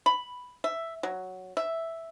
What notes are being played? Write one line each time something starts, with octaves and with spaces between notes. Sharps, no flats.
B5
E5
F#3
E5